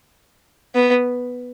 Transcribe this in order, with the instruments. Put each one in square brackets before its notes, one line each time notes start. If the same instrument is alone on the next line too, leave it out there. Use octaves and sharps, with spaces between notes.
[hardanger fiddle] B3